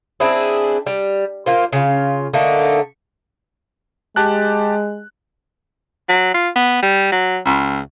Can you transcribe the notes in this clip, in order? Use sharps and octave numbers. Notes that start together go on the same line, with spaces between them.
C4 D4 E4 G#4
G3
A#3 F4 C5
C#3 F4
D3 A3 A#3 D#4
G#3 G4 A5 F#6
F#3
F4
B3
G3
F#3
C#2